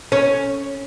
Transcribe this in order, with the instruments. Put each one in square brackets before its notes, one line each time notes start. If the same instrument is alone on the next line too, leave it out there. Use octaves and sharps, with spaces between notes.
[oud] C#4